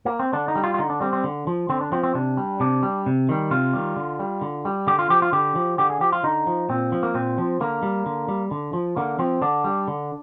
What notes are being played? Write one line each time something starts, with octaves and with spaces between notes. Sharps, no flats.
A#3
C4
D3 D4
D#4
G3
F4
F4
D3 D#4
D4
G3 C4
C4
D3
F3
D3 C4
D4
F3 C4
C4
C3 D4
G3
C3 D4
G3
C3
D#3 G3
C3 F4
D#3 G3
D3
G3
D3
G3
D3 G4
F4
F3 G4
F4
D3 G4
F3
D3 G4
G#4
F3 G4
F4
D3 D#4
F3
A#2 C4
F3
A#3
A#2 C4
F3
D3 A#3
G3
D3
G3
D3
F3
D3 A#3
F3 C4
D3 D4
G3
D3